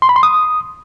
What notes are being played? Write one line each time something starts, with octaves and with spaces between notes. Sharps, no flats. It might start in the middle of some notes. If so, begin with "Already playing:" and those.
C6
B5
C6
D#6